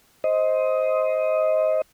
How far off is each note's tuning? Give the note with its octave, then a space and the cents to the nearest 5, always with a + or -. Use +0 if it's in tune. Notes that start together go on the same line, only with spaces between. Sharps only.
C5 +0 D#5 +15